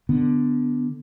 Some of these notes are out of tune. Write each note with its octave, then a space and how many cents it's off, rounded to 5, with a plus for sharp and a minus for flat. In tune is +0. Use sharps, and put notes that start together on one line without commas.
D3 +0 B3 +0